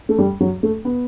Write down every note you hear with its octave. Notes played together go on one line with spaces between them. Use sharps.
A3
G3
F#3
A3
B3